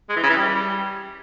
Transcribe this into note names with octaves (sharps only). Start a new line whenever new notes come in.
G#3
E3
C#3
E3
G3